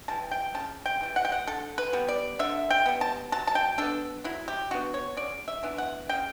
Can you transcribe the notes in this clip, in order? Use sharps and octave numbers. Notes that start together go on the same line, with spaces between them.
E3 G3 A5
G5
C#3 A5
G5
E3 G3
F#5
G5
F#5
D3 A4
B4
G3 B3
D5
D3 E5
G5
G3 B3
A5
F#3 A5
A5
G5
B3 D4 A4
F#3 E4
G4
B3 D4 F#4
C#5
C#3 D5
E5
E3 B3 D4
F#5
C#3 G5